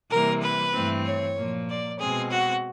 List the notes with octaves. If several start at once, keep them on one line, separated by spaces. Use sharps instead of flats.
C3 E3 G3 A#3 A#4
B4
G2 E3 A3 C4
C#5
A#2 F3 A#3
D5
B2 G#3 C4 G#4
F#4